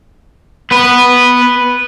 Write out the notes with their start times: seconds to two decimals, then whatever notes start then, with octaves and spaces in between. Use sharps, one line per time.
0.71 B3 B4